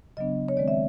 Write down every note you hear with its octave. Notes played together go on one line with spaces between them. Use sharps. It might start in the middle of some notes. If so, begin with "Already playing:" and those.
C#3 F#3 B3 D4 D#5
C#5
D#3 G#3 C4 D5
E5